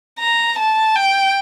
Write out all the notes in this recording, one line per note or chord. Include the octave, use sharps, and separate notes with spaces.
A#5
A5
G5